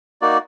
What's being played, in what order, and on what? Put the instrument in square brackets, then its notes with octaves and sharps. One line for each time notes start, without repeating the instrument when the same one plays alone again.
[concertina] A#3 D#4 F#4 D5